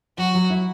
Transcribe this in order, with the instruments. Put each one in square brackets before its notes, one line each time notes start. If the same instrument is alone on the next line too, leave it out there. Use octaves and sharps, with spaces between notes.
[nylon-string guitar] F#3 [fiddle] F#4
[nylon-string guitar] F#3
E4